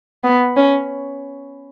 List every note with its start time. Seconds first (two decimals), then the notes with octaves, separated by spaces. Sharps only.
0.24 B3
0.56 C#4